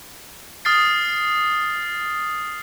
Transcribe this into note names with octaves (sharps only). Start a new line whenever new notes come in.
D#6 F6 A6 C7